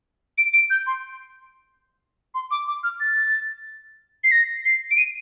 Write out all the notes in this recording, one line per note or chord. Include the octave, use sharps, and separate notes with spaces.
D7
D7
G6
C6
C6
D6
D6
F6
A6
C7
A#6
C7
D7
D#7